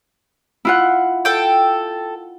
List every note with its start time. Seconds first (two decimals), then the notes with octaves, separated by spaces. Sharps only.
0.65 E4 F4 F#5
1.25 A4 G5